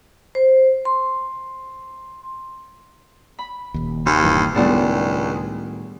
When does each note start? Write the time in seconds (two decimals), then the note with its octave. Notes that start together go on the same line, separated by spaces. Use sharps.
0.35 C5
0.85 C6
3.39 B5
3.74 D#1 D#2
4.06 D#2 C3
4.23 D#1 G2 E3
4.55 C#2 A2 D#3 G3 B3 D4